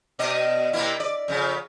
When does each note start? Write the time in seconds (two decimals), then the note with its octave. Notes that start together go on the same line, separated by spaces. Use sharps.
0.19 B2 D5 D#5
0.73 C3 A#3 E4
1.00 D5
1.28 F2 C#3